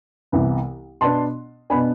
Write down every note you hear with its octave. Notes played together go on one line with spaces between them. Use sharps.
C2 C3 E3 B3
B2 B3 D4 A5 C6
B2 B3 D4 G#5 B5